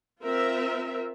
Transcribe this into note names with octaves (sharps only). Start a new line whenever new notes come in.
C4 F4 A#4 E5